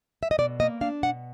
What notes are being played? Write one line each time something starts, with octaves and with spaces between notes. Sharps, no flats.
E5
D#5
B2 D5
A#3 D#5
D4 F5
B2 F#5